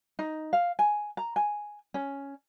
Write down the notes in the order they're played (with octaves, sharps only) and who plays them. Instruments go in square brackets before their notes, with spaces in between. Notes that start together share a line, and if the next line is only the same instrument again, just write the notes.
[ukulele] D#4
F5
G#5
A#5
G#5
C#4